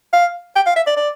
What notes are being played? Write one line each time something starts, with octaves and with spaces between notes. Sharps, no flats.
F5
G5
F5
E5
D5
D5